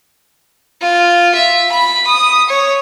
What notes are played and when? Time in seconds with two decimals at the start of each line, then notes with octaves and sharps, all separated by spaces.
0.81 F4
1.35 E5
1.72 B5
2.07 D#6
2.49 C#5